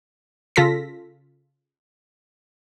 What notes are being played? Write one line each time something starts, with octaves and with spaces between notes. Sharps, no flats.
C#3 F4 A4 A#6 B6